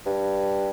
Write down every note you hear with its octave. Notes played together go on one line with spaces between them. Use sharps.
G2